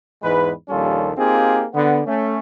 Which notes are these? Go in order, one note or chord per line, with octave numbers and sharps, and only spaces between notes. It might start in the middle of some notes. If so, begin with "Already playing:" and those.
E2 G#2 E3 G#3 B4
A#1 D#2 G3 C#4 F4 A4
A#3 C4 D#4 F4 G4 G#4
D3 B3
A3 C#4